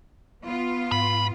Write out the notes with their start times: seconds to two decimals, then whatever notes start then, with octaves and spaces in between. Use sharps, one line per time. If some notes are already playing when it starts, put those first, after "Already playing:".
0.46 B3 F4
0.92 G#2 B5